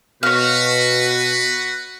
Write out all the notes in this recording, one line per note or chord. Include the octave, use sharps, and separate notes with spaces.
B2 F#4 B4 C#5 F5